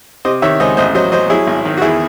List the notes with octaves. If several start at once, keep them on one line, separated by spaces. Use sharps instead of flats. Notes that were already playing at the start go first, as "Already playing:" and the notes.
C3 C5 D#5
D#3 C#5 E5
C#2 C5 D#5
A1 C5 D#5
F#3 C5 D#5
F#3 C5 D#5
F#3 E4 G#4
G#1
D#3
F#4
E2 E4 G#4